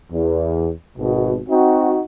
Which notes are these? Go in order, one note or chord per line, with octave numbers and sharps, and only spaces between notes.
E2
G#1 B2
C4 D#4 F#4